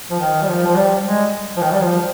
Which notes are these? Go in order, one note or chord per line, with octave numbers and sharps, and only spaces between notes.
F3
D#3
G3
F3
F3
G3
G#3
F3
D#3
G3
F3